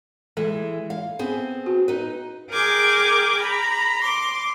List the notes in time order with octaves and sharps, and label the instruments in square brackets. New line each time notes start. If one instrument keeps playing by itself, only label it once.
[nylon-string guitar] E3 G#3 [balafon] A4
[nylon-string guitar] F5
B3 C4 G#4
[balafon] F#4
[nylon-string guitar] D#4 B4
[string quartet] G#4 A#4 G5 D6 G#6
A#5 B5
C6 D6